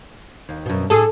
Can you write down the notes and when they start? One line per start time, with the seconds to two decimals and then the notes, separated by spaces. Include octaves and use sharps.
0.49 D#2
0.66 F#2 B2
0.90 A2 G#4 A4